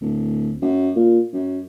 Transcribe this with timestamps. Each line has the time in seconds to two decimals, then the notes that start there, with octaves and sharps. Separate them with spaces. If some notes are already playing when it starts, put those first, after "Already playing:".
0.01 D1
0.61 F#2
0.96 A#2
1.33 F#2